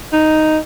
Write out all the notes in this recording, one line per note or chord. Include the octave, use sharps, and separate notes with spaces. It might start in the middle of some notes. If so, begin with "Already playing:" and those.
D#4